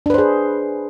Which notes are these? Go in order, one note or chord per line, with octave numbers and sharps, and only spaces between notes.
D4 G#4 B4 C5